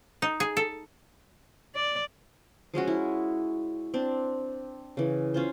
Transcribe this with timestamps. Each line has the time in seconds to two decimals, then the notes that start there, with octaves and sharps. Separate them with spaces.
0.22 D#4
0.40 G#4
0.57 A4
1.75 D5
2.74 F3 G#3 C#4 F#4
2.87 E4
3.94 C4 D4
4.97 C#3 E3
5.34 C#4 F4 C5